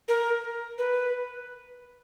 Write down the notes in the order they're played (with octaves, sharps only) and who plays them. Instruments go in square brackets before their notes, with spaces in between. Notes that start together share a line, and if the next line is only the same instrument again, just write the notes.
[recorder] A#4
B4